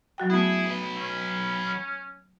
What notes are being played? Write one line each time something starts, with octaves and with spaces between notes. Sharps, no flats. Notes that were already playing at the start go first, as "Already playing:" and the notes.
F#3 F#4 G5
A3 B3 E4 G#4
F#3 B4
C#4